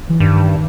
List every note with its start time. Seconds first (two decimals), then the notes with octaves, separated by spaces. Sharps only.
0.09 E3
0.20 G2 D#3